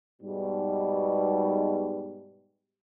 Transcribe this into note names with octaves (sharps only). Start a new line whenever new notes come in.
G#2 B2 G3